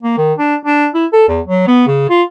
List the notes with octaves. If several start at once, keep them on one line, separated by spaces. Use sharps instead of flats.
A#3
D#3
D4
D4
E4
A4
E2
F#3
B3
C#3
F4